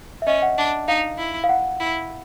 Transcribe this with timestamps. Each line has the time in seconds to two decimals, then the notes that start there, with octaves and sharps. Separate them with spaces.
0.22 E5
0.27 C#4 D#5
0.42 F#5
0.58 D4
0.88 D#4 F5
1.18 E4
1.44 F5
1.49 F#5
1.80 E4